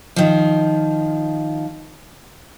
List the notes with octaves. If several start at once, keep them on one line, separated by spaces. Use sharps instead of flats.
D#3 F3